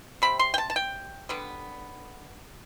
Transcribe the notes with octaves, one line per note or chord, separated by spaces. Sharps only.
C3 G3 C4 B5
C6
G5
A5
A5
G5
D3 G3 B3